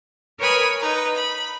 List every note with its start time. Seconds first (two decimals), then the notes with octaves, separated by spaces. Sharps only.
0.39 A#4 B4 C#5 G#5 B5 D#6
0.79 D#4 B4 A#5
1.14 B5